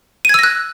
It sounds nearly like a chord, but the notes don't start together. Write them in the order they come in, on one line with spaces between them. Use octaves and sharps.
D#7 G#6 E6 A#6 F#6